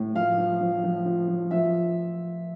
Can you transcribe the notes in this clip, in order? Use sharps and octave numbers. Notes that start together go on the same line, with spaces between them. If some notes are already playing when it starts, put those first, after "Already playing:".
Already playing: A2
F3 F5
F3
F3
F3
F3
F3
F3 E5